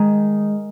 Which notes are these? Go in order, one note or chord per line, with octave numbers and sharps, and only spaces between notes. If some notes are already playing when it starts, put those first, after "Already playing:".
Already playing: D#3 G#3 D#4